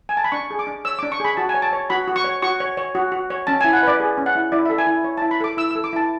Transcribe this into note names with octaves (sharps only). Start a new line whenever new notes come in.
G#5
A5
B5
D4 C#6
G#4
D6
D4
C#5 E6
D4 D6
C#6
G#4 B5
F#4 A5
G#5
C#5
A5
C#5
F#4 B5
F#4
C#6
C#5
F#4 C#6
C#5
C#5
F#4
F#4
C#5
C#4 A5
E4 G#5
F#5
B4 D5
G#4
C#4
F#5
E4
E4 D5
A4 E5
G#5
E4
C#5
E4 A5
B5
A4 D6
E4 E6
A4 E6
D6
E4 A5